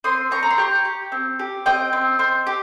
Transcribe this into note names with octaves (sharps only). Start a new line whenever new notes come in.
C4 C6 D#6
C4 A#5 C#6
A#5
C6
G4 A#5 C#6
G4
C4
G4
C4 D#5 G5
C4
C4
G4